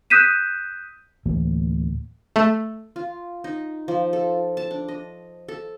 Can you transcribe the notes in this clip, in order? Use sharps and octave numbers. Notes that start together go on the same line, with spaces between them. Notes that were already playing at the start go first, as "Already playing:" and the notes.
D#6 F#6 G6 B6 D#7 E7
D2 A2 E3 A#3
A3
F4
D#4
F3
A4
A5
D4
D#5
A4